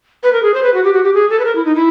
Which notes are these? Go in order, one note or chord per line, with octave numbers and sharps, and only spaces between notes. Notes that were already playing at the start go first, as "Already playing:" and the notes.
B4
A#4
G#4
C5
B4
F#4
G4
F#4
G4
G#4
A4
B4
A#4
E4
D#4
E4